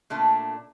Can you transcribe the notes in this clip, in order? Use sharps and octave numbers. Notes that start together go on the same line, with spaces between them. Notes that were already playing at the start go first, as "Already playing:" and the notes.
A#2 A3 D4